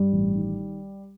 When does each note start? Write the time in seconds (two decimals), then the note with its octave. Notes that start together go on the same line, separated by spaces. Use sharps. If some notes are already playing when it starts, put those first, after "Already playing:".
Already playing: G2 G3
0.13 A1
0.35 D#3